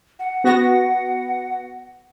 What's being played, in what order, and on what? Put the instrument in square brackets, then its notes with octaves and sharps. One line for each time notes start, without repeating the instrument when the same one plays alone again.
[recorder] F#5
[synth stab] B3 F#4 A#6